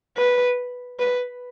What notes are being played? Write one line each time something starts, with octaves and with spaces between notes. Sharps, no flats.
B4
B4